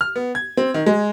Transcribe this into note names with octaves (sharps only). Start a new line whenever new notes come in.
F6
B3
G#6
C4
D#3
G#3